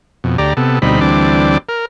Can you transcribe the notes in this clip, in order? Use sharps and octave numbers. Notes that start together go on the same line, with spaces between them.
F2 B2
D2 G4 D5 A#5
C3 B3 A4
D2 B2 G3 C4 D#4 B5
D2 E3 G3 C4 D4 D6
A#4